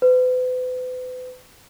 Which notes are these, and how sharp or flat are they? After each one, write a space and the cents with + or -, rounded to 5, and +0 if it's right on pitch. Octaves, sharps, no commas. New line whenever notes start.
B4 +40